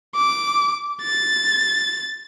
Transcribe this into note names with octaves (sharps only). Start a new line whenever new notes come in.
D6
A6